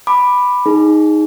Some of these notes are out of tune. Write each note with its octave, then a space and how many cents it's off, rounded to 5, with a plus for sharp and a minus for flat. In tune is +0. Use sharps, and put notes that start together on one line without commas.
B5 +0 D6 +20
D#4 +5 G#4 +0